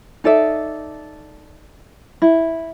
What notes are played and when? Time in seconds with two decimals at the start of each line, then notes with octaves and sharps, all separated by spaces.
0.24 D#4 A4 D5 E5
2.22 E4